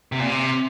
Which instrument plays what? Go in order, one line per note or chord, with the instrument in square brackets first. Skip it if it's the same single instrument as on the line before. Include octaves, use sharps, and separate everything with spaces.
[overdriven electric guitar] C3
A#2
C3